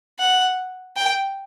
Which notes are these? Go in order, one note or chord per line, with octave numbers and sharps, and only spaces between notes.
F#5
G5